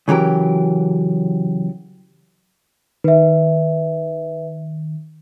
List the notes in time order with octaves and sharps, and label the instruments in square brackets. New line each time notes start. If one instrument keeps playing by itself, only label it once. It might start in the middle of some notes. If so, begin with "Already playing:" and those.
[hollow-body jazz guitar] C#3 E3 F#3 G4 A#4
[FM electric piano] D#3 [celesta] B4 E5